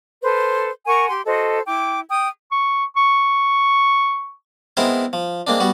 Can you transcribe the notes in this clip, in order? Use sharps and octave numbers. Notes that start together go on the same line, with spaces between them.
A4 B4 C5
A#4 F#5 G#5 C#6
G4 C6
F#4 A4 C5 D#5
E4 G5 D6
G5 D#6
C#6
C#6
G#3 B3 C4 E4 A#4 C5
F3
G#3 A#3 C4 D4
G3 B3 F#4